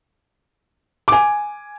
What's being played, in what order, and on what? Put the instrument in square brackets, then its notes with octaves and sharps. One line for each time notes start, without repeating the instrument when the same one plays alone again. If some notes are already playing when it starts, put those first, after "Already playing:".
[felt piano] G#5 D6